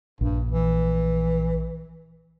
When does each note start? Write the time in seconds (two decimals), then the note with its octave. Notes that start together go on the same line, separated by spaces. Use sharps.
0.21 A#1 G2
0.52 E3